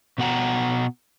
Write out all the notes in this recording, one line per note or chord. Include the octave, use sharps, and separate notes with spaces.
B2 B3 F#4 F#5 G5 A#5